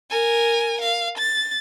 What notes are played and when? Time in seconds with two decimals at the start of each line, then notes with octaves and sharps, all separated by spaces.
0.11 A#4 G#5
0.82 F5
1.18 A6